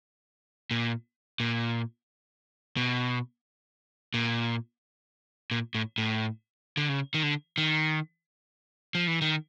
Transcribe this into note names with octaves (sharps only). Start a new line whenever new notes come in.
A#2
A#2
B2
A#2
A#2
A2
A2
D3
C#3
D#3
D3
D#3
F3
E3
D#3